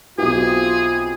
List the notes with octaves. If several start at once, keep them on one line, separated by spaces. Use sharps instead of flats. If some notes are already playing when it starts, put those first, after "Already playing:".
B1 C4 E4 F4 G4 G#4